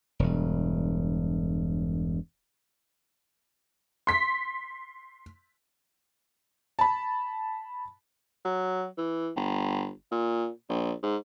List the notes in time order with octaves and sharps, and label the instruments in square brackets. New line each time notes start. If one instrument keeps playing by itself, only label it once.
[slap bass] E1 G2
[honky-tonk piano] C6 B6
[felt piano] A5 B5
[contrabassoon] F#3
E3
G1
A#2
A#1
G#2